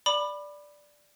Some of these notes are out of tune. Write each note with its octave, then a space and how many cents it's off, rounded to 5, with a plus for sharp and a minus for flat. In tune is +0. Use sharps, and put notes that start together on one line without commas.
D5 +0 B5 +0 D6 +30